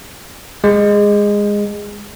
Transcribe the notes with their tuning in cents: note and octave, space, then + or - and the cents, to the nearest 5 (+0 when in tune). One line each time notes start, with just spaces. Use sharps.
G#3 -15